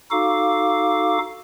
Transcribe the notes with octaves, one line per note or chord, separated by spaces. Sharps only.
D#4 F#4 A4 F5 D6